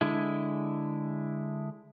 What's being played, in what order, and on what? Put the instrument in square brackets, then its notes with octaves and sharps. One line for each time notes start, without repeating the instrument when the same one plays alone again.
[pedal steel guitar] D3 G#3 E4